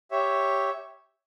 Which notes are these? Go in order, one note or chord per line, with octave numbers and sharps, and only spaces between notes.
G4 C#5 E5